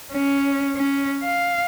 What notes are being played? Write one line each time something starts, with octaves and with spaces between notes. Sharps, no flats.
C#4
C#4
F5